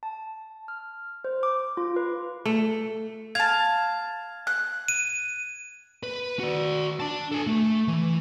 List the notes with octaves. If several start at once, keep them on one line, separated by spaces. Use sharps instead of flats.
A5
F6
C5
D6
F4
B4
A3
F5 A5 G#6
F#6
D#7
B4
F#4 D5
D4 A5
A4 G#5
A3
E3